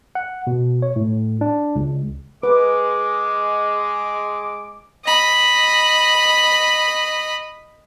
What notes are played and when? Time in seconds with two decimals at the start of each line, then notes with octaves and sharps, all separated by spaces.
0.15 F#5
0.47 B2
0.82 C#5
0.96 A2
1.41 D4
1.75 C#2
2.43 G#3 B4 D6
5.05 D#5 B5